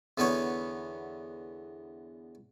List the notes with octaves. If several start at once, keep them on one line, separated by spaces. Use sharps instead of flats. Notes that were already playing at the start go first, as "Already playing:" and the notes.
E2 D3 B3 B4 C#5